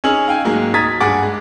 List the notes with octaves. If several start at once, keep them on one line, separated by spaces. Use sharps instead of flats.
C#4 D#4 G#4 E6 F6 F#7
F5 G5 G#5
G#2 F#3 G#3 A#3
A#5 D#6 G#6 A6 B6
G2 G#4 F#5 D6 A6
G#3